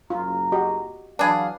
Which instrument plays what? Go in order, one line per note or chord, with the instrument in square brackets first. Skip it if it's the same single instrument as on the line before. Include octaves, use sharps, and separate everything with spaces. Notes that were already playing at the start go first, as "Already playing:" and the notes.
[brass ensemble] F#1 A#5 [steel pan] F4
[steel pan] F#4 G4 D#5
[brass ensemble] E3 F#3 F5 [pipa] D4 G#4 [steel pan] B4